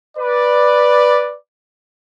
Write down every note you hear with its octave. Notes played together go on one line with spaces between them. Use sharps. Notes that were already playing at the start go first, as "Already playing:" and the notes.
B4 D5